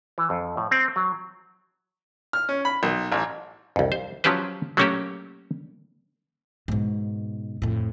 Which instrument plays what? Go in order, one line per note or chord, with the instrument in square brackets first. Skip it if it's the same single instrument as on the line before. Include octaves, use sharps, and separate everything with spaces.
[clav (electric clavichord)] E3
F2
A2
C4
F#3
[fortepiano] F6
C#4
B5
B1
A1
[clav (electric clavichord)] C2 F2
C5
F3 F#3 C#4 G4 B4 C5
F#3 A3 A#3 C#4 F#4 G4
[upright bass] G#2 B2
F2 A2